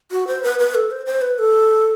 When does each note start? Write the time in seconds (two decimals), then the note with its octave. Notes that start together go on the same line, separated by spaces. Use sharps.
0.11 F#4
0.27 C5
0.43 B4
0.59 B4
0.75 A4
0.91 C5
1.06 C5
1.21 B4
1.38 A4